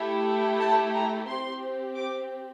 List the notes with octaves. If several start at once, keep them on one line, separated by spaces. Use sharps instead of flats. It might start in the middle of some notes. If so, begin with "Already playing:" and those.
Already playing: A3 E4 G4
A5
A#5
C4 G4 C6
D6